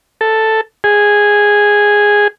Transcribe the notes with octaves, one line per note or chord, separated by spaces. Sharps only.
A4
G#4